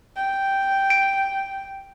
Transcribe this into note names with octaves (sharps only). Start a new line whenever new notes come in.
G5
D7